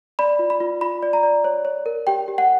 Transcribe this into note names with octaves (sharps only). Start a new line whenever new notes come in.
D5 B5
F4
B5
F4
F4 B5
D5
A#5
D5
C#5
C#5
A#4
G4 G5
G4
F#5